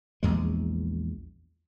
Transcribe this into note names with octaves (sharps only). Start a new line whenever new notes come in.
A#1 E2 G#3